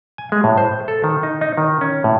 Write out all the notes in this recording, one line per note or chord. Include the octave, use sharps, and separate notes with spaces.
G#5
G#3
A2
C5
A4
D#3
D#4
D#4
D#3
C#4
A2